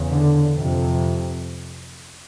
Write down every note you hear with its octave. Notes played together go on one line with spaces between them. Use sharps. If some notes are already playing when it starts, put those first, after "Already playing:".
Already playing: E2 C#3
D3
F2 C3